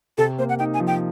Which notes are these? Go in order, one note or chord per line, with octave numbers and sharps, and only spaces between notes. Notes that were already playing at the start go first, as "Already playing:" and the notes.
C3 A4
A#3 C5
F#5
D#4 G5
G#5
F3
G5